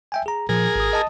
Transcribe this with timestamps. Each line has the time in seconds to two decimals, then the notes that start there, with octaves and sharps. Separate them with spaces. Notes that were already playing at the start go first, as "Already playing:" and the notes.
0.12 E5 G5 G#5
0.26 G#4 A#5
0.49 A#2 F3 G#4 A#4
0.75 G#1 D#6
0.93 D#5 A5 D#6